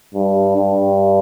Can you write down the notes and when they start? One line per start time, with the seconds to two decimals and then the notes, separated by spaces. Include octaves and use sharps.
0.14 G2
0.56 G2